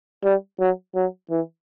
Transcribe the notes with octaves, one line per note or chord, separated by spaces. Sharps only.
G3
F#3
F#3
E3